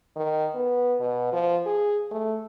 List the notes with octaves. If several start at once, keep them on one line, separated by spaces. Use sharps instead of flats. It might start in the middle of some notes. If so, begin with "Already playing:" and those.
D#3
B3
B2
F3
G#4
A3